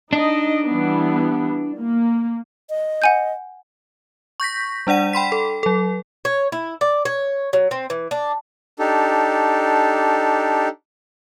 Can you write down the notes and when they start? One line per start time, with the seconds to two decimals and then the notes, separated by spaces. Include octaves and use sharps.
0.13 D4 D#4 D#5
0.67 E3 G3 B3
1.79 A#3
2.70 D#5
3.02 F#5 G#5 G6
4.40 C#6 G6 A#6 B6
4.87 G3 D4 D5 F#5 D#7
5.13 G5 B5 C6 B6
5.32 A4
5.63 F#3 A4
6.25 C#5
6.52 E4
6.81 D5
7.05 C#5
7.53 F#3
7.71 C4
7.90 E3
8.11 D4
8.79 D4 D#4 G4 A4